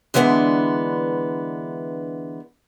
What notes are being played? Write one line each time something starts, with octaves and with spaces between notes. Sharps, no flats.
D3 E3 G#3 B3 C#4 D4